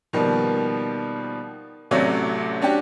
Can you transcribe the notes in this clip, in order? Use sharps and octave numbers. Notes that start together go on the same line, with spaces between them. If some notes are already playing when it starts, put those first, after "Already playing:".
B2 D#3 F3 G3 A#3
A1 C3 F#3 A3 C#4 D5
C#4 D4 F#4 G4